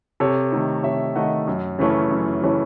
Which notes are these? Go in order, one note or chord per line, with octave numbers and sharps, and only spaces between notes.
C3 A4 C#5
D#3 A3 D#4
C3 C#5 E5
D#3 A3 D#4 D#5 F#5
F#2
C#3 E3 A3 C#4
F#2
C#3 E3 A3 C#4